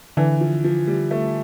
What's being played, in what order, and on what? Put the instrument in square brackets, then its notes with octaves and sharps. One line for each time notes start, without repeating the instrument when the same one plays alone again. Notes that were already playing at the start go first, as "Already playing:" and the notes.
[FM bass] D3 [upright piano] E3
[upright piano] F3
F3
G3
A3